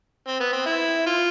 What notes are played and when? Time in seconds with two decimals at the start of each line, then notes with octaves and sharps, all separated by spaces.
0.27 C4
0.40 B3
0.53 C4
0.66 E4
1.06 F4